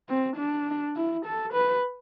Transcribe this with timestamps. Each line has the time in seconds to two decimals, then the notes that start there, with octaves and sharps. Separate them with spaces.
0.09 C4
0.37 D4
0.97 E4
1.26 A4
1.54 B4